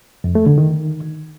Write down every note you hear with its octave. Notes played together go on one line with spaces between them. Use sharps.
F2
A3
D3
D#3